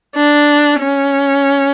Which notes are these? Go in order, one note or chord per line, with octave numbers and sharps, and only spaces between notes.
D4
C#4